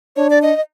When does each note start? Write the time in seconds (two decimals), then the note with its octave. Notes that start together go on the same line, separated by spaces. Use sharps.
0.16 D4 C#5
0.30 D5
0.42 D#5
0.56 D#5